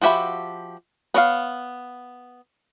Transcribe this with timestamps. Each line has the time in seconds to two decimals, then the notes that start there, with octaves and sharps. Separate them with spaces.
0.02 F3 F#4 G4 E5 B5
1.14 B3 C#5 D5 F5